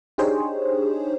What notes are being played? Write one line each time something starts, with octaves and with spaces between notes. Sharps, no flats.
D4 D#4 G4 G#4 C5 C#5